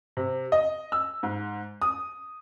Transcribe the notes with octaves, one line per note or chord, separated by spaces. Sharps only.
C3
D#5
E6
G#2
D#6